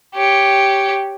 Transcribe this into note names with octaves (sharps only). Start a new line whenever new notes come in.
G4 C#5